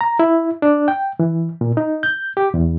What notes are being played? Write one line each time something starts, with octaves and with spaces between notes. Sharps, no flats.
A#5
E4
D4
G5
E3
A#2
D#4
G6
G4
E2